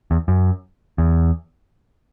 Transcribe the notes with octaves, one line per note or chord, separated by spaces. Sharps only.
E2
F#2
E2